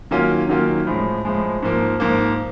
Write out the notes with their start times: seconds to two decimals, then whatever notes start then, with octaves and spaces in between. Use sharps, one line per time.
0.11 D#3 F#3 A#3 C#4 F4
0.49 D#3 F#3 A#3 C#4 F4
0.87 A2 F3 G#3
1.25 A2 F3 G#3
1.62 G#2 F3 A#3
2.00 G#2 F3 A#3